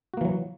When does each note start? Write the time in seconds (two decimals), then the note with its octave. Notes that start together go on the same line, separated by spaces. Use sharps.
0.14 F#4
0.17 A#3
0.21 E3
0.25 F#3